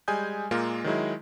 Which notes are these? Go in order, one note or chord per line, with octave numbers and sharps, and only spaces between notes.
G3 G#3 G#5 D#6 G6
A#2 G#3 A#3 F4 A#4
D#3 F#3 G#3 E4